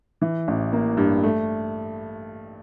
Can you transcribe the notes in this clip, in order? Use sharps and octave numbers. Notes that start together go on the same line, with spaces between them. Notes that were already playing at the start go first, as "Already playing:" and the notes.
E3
A1
A#3
G2
A3